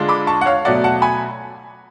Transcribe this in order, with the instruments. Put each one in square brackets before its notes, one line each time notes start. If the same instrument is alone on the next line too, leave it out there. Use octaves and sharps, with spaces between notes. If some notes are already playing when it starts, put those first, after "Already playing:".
Already playing: [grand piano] D3 G#3 D4 F4
B5 D6
A5 C#6
F#5
C#5 F5
B2 F#3 A3 D5 F#5
F#5 A5
G#5 B5